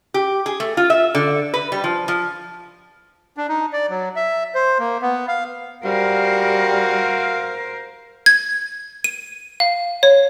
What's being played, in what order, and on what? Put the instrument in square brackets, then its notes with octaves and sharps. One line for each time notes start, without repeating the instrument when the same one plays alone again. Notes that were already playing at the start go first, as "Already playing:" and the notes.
[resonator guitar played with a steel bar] G4
G#4
A3
F4
E5
D3
B4
G3
F3
F3
[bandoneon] D4
D#4
D5
F#3
E5
C5
A#3
B3
F5
[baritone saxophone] G3 [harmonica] F#4 F5 [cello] A#4 C5
[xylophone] G#6
D#7
F5
C#5